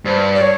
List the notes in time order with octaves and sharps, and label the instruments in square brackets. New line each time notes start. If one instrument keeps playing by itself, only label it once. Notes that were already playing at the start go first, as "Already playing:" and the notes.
[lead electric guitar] G2 [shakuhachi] C5
[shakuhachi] D5
C#5